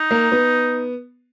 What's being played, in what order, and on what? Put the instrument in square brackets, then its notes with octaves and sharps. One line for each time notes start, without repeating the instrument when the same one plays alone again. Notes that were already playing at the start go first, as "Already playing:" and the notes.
Already playing: [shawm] D#4
[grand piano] A#3
B3